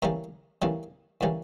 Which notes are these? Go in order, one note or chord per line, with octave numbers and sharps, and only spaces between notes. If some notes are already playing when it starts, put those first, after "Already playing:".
A2 E3 G3 A#3 C#4 A#5
A2 E3 G3 A#3 C#4
A2 E3 G3 A#3 C#4